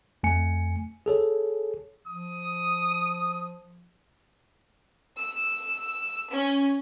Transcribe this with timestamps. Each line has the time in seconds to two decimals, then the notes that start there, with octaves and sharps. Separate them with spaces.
0.23 F2 A3 G#5 C#7
1.06 G#4 A4 C#5
2.07 F3 D#6
5.18 E6
6.33 C#4